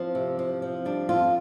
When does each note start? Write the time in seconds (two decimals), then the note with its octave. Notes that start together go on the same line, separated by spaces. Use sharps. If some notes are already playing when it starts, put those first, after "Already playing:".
Already playing: F3 C4
0.15 C3
0.39 F3
0.62 F3
0.85 G3 D4
1.09 F2 F4